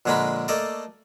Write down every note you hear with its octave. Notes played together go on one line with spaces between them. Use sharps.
A#1 D3 G#3 C#4 A#5 B5
A3 A#3 A4 D5 D#5